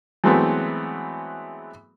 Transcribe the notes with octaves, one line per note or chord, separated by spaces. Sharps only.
E3 F#3 G#3 A3 B3 C4